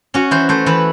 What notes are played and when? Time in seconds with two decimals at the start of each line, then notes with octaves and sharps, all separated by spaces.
0.14 C#4 F#4
0.31 E3 C5
0.49 A3 C5
0.66 E3 B4